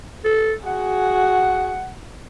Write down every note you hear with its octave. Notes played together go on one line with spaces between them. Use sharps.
A4
F#4 G#4 F#5